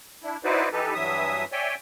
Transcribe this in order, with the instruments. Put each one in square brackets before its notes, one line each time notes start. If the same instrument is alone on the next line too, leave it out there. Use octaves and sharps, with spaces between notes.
[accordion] D4 E4
D#4 E4 F#4 B4 C5 D5
E3 D#4 G4 A4 B4
G2 E3 F#3 E5 D#6
C#5 D5 E5 G5 G#5